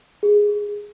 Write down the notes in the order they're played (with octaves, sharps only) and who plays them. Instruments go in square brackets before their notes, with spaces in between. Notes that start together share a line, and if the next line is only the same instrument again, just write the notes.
[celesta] G#4